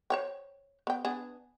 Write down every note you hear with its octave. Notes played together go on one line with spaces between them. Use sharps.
C5 C#5 G5
B3 G5
B3 D4 G#4